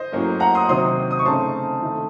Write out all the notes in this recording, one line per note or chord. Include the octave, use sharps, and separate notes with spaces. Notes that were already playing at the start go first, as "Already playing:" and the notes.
Already playing: C5 D#5
A2 F#3 A#3 C#4
F#5 A#5
C6 D#6
C3 D#3 F#3 C4 C6 D#6
D#6
C#6
C#3 A3 C4 D#4 A5 C6
D#3 A3 D#4